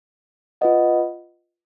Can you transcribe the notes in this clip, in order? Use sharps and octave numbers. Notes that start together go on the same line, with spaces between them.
F4 B4 D#5 F#5